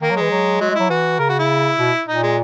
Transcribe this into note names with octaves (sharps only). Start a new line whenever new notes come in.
D#3 A#3
F#3
E3 G#3
F#3
F#3 G#3
G#3
F#3 E4
E3 F#4
C#3 A#4
F#4
E4
B2
A#2 D#4
G#3